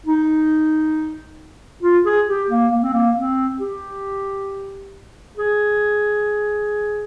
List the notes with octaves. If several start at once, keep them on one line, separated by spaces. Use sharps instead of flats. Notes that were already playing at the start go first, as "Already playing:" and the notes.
D#4
F4
G#4
G4
A#3
A#3
C4
A#3
C4
G4
G#4